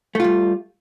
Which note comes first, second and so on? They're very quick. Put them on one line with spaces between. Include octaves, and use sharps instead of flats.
A3 F4 G3